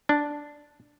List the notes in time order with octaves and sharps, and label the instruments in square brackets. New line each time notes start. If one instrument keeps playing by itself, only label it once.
[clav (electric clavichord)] D4